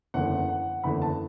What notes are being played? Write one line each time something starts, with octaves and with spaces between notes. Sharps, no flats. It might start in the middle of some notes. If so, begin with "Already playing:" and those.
F#1 E2 D3 F#5
F#5
F#1 E2 D3 B5
A5